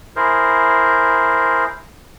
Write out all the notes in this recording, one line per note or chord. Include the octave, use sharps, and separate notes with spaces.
E4 G#4 A#4 C5